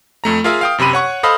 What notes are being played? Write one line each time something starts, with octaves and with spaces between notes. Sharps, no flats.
F2 A3 A#5
F4 G#4 A#4 E5 F5
F5 G5 D#6
F#2 C3 G4 B5 D#7
C#5 F#5 C#6
A4 C5 D#5 F5 B5 D#6